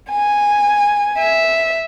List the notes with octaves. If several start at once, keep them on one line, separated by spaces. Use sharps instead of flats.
G#5
E5